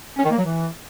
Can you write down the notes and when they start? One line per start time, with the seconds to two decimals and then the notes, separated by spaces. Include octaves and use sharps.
0.17 C#4
0.24 D#3
0.31 A#3
0.38 F#3
0.44 E3